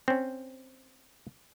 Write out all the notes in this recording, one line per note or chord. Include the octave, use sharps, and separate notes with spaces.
C4 C#4